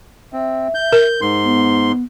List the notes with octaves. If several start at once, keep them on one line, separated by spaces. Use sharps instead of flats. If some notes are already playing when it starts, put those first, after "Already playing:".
C4 E5
G6
A#4
G#2 C6
B3